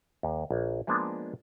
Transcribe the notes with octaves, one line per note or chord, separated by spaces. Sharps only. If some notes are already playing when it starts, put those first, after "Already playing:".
D#2
A#1
F3 G#3 A#3 B3 D4